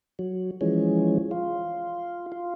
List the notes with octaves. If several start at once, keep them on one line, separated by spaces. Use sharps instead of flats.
F#3
E3 F3 G#3 C#4
F4
F4